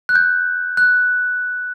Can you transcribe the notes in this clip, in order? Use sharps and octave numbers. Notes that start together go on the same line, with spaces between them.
F#6
G6
F#6